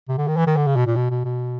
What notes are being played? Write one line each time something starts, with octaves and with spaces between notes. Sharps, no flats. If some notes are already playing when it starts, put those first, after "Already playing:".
C3
D3
D#3
E3
D#3
D3
C#3
B2
A#2
B2
B2
B2